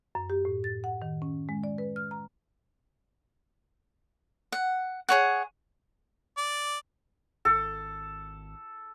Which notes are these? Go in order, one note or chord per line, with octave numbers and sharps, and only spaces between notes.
F#2
G4
A2
A6
F#5
D#3
C#4
G#3
D5
B4
F6
A#5
F#5
G#4 C#5 F#5
D5
G#1 A4